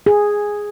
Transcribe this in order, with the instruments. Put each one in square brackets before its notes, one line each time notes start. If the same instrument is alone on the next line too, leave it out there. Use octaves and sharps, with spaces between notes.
[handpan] G#4